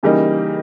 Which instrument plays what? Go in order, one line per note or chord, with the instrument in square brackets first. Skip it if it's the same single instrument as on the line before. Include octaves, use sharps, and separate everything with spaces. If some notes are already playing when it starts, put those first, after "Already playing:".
[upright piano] C#3 E3 G3 A#3 D#4